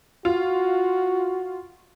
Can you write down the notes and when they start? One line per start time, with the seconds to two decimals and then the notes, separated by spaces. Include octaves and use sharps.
0.25 F4 F#4